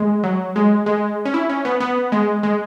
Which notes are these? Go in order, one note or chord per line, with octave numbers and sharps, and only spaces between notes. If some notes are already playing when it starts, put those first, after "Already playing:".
Already playing: G#3
F#3
G#3
G#3
C#4
E4
C#4
B3
B3
G#3
G#3